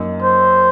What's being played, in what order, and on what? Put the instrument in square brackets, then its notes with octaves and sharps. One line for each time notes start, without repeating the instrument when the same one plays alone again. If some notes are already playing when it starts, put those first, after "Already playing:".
Already playing: [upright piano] F#2 A#3 D#4
[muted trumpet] C5